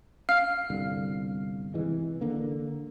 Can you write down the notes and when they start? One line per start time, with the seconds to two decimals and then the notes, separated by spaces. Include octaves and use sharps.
0.29 F5 F6
0.70 G1 C2 D3
1.74 C3 E3 G#3
2.21 D3 A#3